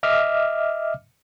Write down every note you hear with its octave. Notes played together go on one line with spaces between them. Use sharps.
D#5 E5 D6 F6